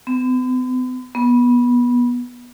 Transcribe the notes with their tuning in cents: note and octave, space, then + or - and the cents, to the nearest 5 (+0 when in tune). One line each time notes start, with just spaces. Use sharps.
B3 +45
B3 -20